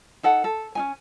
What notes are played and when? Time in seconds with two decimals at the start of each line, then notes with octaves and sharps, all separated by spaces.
0.23 D#4 A4 F#5
0.44 A4
0.75 C#4 D#4 G#5